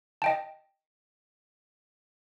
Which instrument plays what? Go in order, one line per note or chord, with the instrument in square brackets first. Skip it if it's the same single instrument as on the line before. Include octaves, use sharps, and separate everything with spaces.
[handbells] D#5 G5 A5